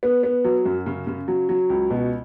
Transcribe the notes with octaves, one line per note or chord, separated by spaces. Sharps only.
B3
B3
F#3
F#2
C#3
C#3
F#3
F#3
C#2
B2